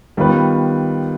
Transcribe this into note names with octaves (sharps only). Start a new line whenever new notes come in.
D#3 G3 B3 F4 B4